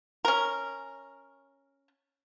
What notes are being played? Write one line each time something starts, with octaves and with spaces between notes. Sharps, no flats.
C#4 A#4